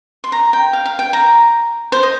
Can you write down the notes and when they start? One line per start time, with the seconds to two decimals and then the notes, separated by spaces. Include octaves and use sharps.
0.24 C6
0.32 A#5
0.53 G5
0.73 F5
0.85 F5
0.99 G5
1.13 A#5
1.92 C5
2.03 D#5